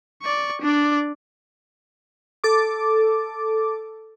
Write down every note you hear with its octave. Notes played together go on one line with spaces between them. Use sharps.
D5 C#6
D4 D5
A4 D6